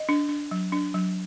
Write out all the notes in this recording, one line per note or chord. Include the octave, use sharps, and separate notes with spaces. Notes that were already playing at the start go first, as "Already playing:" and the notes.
Already playing: D#5
D4
D4
F#3
D4
F#3